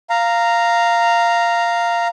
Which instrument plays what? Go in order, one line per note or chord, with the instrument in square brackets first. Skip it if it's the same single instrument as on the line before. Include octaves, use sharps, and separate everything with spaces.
[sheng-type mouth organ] F5 A#5